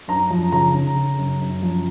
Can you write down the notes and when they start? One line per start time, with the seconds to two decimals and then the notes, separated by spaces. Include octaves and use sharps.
0.08 F#2 A#5
0.30 F3
0.52 C#3 A#5
0.74 C#3
0.96 C#3
1.18 F#2
1.41 F#2
1.63 F3